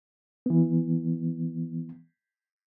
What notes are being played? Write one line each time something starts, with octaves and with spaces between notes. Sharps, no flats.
E3 B3